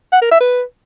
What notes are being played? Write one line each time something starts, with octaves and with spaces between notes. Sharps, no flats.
F#5
A#4
E5
B4